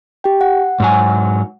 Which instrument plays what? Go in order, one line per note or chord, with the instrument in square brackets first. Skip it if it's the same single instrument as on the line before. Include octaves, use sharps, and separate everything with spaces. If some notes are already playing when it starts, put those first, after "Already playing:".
[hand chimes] G4 G5
F#5
[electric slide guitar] G#2 F#3 G#5